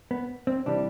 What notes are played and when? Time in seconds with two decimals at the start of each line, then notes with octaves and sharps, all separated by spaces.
0.11 B3
0.47 C4
0.66 C3 E3 G3 D4